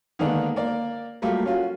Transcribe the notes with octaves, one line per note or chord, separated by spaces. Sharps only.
D3 D#3 G#3 A#3 B3 D4
A#3 A#4 D5
F#3 G3 A3 A#3 F4 G4
C#4 F4 F#4